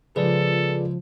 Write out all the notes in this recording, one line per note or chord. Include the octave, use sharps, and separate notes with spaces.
C#2 F3 G#4 A4 B4 D5